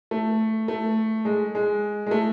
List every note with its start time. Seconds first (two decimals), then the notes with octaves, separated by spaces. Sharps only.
0.11 A3
0.68 A3
1.25 G#3
1.55 G#3
2.07 G#3
2.11 A3